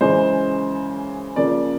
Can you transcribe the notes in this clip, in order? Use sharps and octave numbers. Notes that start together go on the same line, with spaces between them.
F#2 C#3 E3 G#3 C5
C#3 F3 A#3 D5